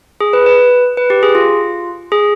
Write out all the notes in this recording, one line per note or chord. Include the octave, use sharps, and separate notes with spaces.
G#4
B4
B4
B4
G4
G#4
F4
G#4